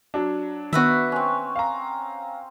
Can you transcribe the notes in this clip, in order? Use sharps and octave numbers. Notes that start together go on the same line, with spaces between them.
F#3 D4
D#3 B3 F#4 B4 E5
C4 C#4
F5 A#5